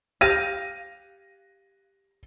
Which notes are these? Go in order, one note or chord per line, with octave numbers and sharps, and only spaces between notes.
G4 F5 A#6 D#7